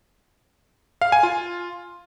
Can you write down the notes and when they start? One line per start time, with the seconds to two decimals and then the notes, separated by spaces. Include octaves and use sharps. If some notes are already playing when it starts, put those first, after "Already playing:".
1.01 F5
1.12 G#5
1.23 F4